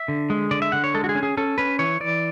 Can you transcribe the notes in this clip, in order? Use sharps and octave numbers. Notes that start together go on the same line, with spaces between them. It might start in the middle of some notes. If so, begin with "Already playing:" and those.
Already playing: E5
D3
G#3
D3 D5
E5
D3 F#5
C#5
G#3 A4
F#4
G#4
C#4
G#4
C#4 A4
C#4 B4
E3 C#5
E3 D5